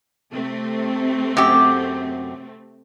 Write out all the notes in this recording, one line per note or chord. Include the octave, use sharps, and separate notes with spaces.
C3 A3 C4
F#2 G4